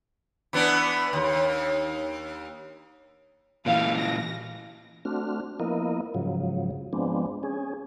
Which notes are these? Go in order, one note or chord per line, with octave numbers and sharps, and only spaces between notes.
E3 B3 D4
D#2
A#2 E3 F5
A#6
A3 C4 D4 F#4 F6
F3 A#3 B3 E4 A#4 D#5
G#2 C#3 F3 F#3
F3 G#3 B3 C4 D4
C#4 G#4